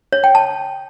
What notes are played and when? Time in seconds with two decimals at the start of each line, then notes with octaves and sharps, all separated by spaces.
0.13 C#5
0.24 G5
0.35 A5